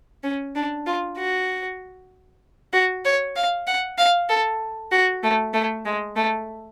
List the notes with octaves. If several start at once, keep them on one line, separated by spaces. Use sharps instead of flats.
C#4
D4
F4
F#4
F#4
C#5
F5
F#5
F5
A4
F#4
A3
A3
G#3
A3